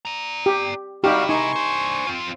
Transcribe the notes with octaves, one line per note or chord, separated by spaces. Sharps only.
D5 A#5
G4
C3 G3 D#4 E4 F#4 G4 F5
D#4 G#5 C6 C#6
D4 C5
C4 F4